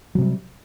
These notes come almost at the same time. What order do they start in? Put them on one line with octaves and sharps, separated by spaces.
F#3 C3 G3